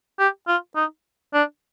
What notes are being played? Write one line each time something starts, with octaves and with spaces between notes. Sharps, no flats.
G4
F4
D#4
D4